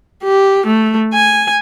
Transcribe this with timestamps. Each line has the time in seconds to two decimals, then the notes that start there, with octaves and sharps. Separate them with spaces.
0.23 G4
0.66 A3
1.14 G#5